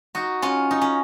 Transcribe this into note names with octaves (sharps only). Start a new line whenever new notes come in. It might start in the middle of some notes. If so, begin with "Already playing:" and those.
D#4 F#4
C#4 F4
D#4
C#4